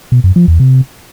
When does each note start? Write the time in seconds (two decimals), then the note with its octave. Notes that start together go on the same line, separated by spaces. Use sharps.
0.12 B2
0.24 F#2
0.36 F3
0.48 E2
0.60 C3